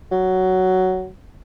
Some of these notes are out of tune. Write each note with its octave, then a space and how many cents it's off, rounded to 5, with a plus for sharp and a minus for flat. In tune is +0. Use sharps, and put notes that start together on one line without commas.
F#3 +10